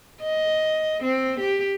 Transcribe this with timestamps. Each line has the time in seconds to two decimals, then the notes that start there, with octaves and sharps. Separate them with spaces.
0.22 D#5
1.03 C4
1.39 G4